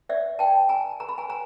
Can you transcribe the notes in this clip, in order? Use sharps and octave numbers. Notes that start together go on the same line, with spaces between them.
D5 E5
G5 A5
G#5 A#5
A#5
B5
G#5 A#5
G#5 A#5